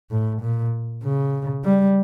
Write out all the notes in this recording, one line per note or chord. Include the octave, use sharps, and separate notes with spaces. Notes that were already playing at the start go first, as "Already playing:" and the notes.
A2
A#2
C#3
G3